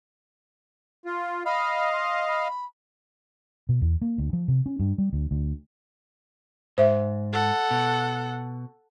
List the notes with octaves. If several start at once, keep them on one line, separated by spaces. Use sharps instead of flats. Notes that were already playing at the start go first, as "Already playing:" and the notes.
F4
D#5 F5 B5
C6
B5
B2
E2
A#3
D2
F3
C3
C#4
G2
G3
D2
D2
G#2 C5 E5
A4 F#5
B2